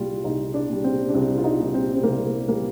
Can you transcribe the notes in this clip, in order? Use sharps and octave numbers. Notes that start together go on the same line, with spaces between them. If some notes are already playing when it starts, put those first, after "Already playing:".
Already playing: C2 A#2 G3 F4
C2 D#4
D4
A#2 G3
C4
D4
C2 C4
F4
D#4
A#2 G3
C4
C4
C2 A#3
A#2 G3 A#3